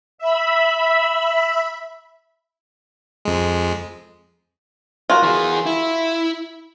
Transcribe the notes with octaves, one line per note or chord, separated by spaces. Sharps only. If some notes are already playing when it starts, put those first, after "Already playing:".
E5 B5
F2 G#3
F4 F#4 A#4
E3 G#4
E4